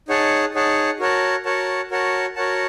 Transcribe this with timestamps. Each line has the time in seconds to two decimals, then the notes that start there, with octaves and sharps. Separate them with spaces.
0.08 D#4 G#4 C#5 F#5 A5
0.54 D#4 G#4 C#5 F#5 A5
0.99 F#4 A#4 C#5 F#5 A5
1.45 F#4 A#4 C#5 F#5 A5
1.91 F#4 A#4 C#5 F#5 A5
2.35 F#4 A#4 C#5 F#5 A5